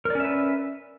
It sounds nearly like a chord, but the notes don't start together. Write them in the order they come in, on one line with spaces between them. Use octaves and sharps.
A#4 D5 C#4 E5 B4